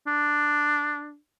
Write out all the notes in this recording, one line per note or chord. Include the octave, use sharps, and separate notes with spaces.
D4